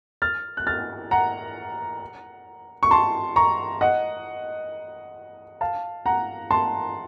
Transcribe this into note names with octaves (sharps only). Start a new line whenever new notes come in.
F6 A6
F#6
F6 A6
F#5 A#5
C#6
A5 C6
A#5 C#6
D#5 F#5
F5 A5
F#5 A#5
A5 C6